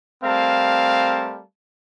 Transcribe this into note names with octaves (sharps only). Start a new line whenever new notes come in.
G3 A3 C4 A#4 F5 A5